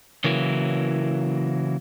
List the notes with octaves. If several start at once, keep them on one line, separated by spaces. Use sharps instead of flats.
C#3 E3 F#3 A#3 E4 A#4